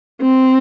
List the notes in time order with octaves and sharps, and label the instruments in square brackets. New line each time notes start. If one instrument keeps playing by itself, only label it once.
[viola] C4